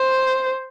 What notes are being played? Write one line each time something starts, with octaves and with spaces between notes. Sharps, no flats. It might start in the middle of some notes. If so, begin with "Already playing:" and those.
Already playing: C5